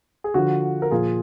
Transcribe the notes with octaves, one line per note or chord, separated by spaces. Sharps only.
G#4
D3 F3 F#4
A#4
A#2 F3 F4 G#4